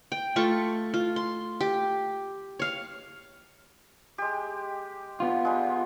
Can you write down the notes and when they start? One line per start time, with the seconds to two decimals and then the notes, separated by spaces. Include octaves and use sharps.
0.12 G5
0.36 A3 F4 C#6
0.94 F4
1.16 C6
1.61 G4
2.59 C#5 F5
4.18 G#3 G4
5.20 B3 F4
5.45 G3 G#3